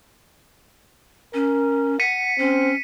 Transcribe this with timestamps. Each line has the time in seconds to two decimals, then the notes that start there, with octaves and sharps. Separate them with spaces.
1.34 C#4 A#4
2.00 F#5 B6 C#7 D#7
2.39 C4 C#4